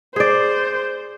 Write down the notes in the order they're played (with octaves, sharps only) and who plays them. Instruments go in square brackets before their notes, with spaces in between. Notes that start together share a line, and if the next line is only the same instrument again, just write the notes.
[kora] G#4 D5 [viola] C5